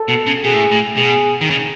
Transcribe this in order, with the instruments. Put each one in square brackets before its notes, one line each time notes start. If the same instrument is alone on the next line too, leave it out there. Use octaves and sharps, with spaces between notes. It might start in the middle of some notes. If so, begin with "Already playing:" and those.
Already playing: [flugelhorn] A4
[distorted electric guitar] B2
C#3
[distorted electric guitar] B2 [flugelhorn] G#4
[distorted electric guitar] A2
A2
[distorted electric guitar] B2 [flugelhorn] G#4
[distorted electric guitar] D#3
C#3